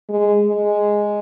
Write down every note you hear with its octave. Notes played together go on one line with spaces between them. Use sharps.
G#3
G#3